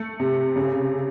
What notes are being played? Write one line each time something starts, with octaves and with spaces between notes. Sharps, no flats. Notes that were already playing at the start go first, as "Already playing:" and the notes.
Already playing: A3
C3
C#3